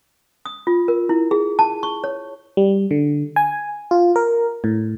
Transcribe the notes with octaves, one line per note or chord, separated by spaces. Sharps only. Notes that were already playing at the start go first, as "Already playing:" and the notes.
D#6
F4
A#4
E4
G#4
A5
C#6
C#5
G3
D3
G#5
F4
A#4
A2